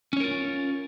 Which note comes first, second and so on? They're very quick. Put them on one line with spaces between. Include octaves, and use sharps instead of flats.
C#4 C#5 A#4 F4